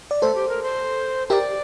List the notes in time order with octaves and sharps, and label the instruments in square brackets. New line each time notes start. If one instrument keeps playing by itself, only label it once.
[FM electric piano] D5
[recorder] A3 [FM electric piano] A4 C5
[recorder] G4
A#4
C5
[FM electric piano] G4 A#4 [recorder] D5 E5